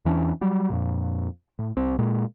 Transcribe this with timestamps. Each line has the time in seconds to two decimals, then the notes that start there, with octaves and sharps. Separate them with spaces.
0.05 E2 E3 C#4 D4
0.41 F#3 G3
0.70 F2 A#2
1.59 A2
1.77 C2 C4
1.99 A#2 G#3